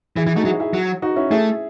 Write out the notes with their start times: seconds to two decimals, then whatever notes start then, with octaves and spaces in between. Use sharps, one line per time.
0.16 E3 E4 G#4
0.27 E3 E4 G#4
0.35 A3 D#4 F#4
0.45 F#3 E4 G#4
0.60 E4 G#4
0.74 F#3
1.02 D#4 F#4
1.16 C#4 E4
1.31 A3 E4 G#4